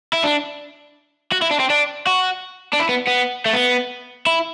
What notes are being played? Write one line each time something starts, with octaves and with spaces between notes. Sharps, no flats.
E4
D4
F#4
E4
D4
C4
D4
F#4
D4
E4
B3
B3
A3
B3
E4